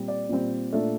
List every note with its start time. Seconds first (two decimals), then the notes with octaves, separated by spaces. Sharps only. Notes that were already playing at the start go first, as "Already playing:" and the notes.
Already playing: A#2 G3 C4
0.08 D5
0.29 A#2 G3 C4
0.73 A#2 A3 D4